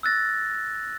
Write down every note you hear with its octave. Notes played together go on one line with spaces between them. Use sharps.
E6 F#6 A6 A#6